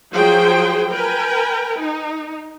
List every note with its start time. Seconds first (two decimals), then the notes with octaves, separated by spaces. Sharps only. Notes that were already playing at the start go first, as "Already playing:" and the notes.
0.12 F3 F#3 G#4 C5 G5
0.91 A#4 B4 G5 G#5
1.80 D#4